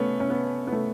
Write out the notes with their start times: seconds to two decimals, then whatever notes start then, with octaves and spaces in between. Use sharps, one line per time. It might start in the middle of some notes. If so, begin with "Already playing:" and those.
Already playing: A3 B3 C#4
0.20 C#4
0.30 B3
0.67 B3
0.72 A3